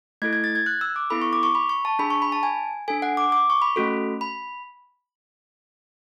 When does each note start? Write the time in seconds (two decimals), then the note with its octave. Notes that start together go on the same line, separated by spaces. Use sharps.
0.22 A3 E4 A4 G#6
0.33 G#6
0.44 A6
0.55 G#6
0.66 F#6
0.81 E6
0.96 D6
1.10 B3 E4 A4 B5
1.22 C#6
1.33 D6
1.43 C#6
1.55 B5
1.69 C#6
1.85 A5
1.99 D4 G#4 B5
2.10 C#6
2.22 B5
2.32 A5
2.43 G#5
2.88 D4 A4 G#5
3.02 F#5
3.17 D6
3.32 D6
3.50 C#6
3.62 B5
3.76 A3 C#4 F#4 A4
4.21 B5